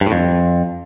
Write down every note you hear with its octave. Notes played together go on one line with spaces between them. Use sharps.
G2
A2
F2